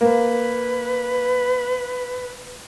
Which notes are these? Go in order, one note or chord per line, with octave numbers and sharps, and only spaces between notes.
A#3 B4